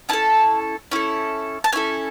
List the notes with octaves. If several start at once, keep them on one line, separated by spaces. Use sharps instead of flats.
C#4 E4 A4 A5
C#4 E4 A4
A5
C#4 E4 A4 G#5